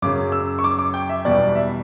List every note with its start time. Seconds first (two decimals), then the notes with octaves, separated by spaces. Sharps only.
0.02 F#2 C#3 F#3 D6
0.32 E6
0.59 C#6
0.64 D6
0.79 D6
0.94 G5
1.09 E5
1.25 E2 B2 G3 B3 D5
1.55 E5